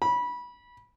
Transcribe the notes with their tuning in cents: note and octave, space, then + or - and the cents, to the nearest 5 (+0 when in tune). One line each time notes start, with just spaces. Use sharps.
B5 -20